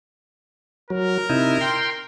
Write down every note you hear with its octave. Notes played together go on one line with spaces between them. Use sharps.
F#3 A#4
C3 D#4 E4
G5 C6